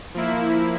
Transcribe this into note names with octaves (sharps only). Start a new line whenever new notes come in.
F3 A#3 E4